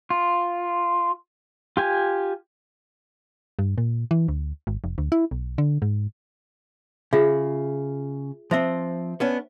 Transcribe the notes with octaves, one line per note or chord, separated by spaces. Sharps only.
F4
F4 G4 G#5
G2
A#2
E3
D2
G#1
F1
D2
E4
B1
D3
G#2
C#3 F4 G#4 E5
F3 C4 C5 E5
B3 C#4 D4